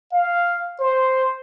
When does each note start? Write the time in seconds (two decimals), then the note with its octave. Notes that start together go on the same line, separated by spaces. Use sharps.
0.12 F5
0.80 C5